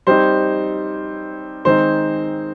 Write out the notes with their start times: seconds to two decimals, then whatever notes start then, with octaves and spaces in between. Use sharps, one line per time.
0.07 G3 C4 D#4 C5
1.65 D#3 G#3 C4 D#4 C5